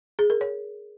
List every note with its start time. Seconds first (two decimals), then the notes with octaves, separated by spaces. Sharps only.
0.19 G#4
0.30 A#4
0.41 C#5